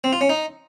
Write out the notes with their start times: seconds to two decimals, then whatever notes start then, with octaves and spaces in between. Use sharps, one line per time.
0.04 C4
0.13 F4
0.21 C#4
0.29 D#4